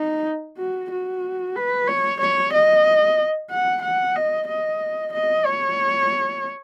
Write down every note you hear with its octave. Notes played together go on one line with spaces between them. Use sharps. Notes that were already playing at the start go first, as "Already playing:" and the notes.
Already playing: D#4
F#4
F#4
B4
C#5
C#5
D#5
F#5
F#5
D#5
D#5
D#5
C#5